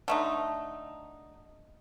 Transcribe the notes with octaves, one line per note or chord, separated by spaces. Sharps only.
D3 A3 D#4